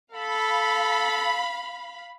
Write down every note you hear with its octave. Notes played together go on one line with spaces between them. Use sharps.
A4 F5 B5